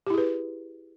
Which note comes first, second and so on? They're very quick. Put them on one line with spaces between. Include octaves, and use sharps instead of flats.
G4 E4 G#4 B4